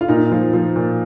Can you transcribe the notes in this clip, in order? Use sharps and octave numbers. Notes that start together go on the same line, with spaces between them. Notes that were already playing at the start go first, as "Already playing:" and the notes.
F4
A#2 D#4
F3
F3
A#2